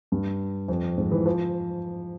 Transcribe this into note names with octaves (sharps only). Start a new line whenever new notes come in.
G2
F2
G#2
E3
F3